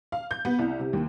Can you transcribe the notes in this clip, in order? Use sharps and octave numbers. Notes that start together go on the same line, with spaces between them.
F5
G6
B3
C2
C3
D#2